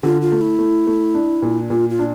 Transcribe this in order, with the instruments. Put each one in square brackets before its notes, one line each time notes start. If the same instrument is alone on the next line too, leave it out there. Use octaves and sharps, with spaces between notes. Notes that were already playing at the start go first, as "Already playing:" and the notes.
[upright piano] D3 [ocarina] F4
[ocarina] F4
[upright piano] A3
[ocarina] E4
[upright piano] A3
A3
D4
A#2
[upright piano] A#2 [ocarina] F4
[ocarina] F4
[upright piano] D4